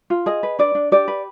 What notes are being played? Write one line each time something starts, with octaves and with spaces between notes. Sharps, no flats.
F4
G#4 D#5
B4
D4 D5
D4
G4 D5
B4